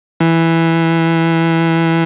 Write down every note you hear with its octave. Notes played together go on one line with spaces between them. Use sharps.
E3